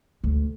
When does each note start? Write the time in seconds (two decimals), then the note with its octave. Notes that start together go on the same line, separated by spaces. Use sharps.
0.24 D2